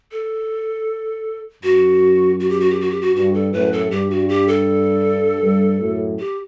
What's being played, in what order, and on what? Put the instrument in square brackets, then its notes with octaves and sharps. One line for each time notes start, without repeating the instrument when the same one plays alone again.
[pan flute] A4
[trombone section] F#2 [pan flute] F#4
[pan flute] F#4
G4
F#4
G4
F#4
G4
F#4
[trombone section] G2 [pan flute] F#4
[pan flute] A4
[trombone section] F#2 A2 [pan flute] B4
[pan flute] A4
[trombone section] G2 [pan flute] G4
[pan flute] F#4
G4
A4
[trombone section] G2
F#2 A2
[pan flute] G4